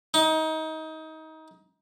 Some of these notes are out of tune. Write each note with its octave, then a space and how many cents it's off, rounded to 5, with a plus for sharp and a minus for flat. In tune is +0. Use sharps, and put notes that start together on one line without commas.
D#4 +25